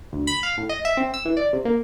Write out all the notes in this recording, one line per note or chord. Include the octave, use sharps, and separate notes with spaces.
D2
B5
F5
A2
D#5
E5
C4
E6
E3
D5
C3
A#3